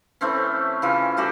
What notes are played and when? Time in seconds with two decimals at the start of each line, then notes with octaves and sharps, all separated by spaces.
0.21 E3 A3 C4 C#4
0.82 C#3 E3 F4
1.17 G3 A3 F#4 G4